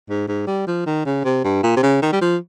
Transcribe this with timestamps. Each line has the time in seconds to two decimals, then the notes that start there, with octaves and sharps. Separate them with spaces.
0.09 G#2
0.28 G#2
0.47 G3
0.67 F3
0.86 D#3
1.05 C#3
1.25 C3
1.44 G2
1.63 A#2
1.77 C3
1.83 C#3
2.02 D#3
2.13 G3
2.21 F3